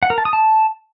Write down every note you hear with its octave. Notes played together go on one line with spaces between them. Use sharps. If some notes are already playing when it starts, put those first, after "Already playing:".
F#5
A#4
A5
D#6
A5